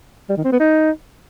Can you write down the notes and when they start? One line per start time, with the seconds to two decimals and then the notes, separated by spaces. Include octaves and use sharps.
0.29 G3
0.37 D#3
0.44 C4
0.52 B3
0.59 D#4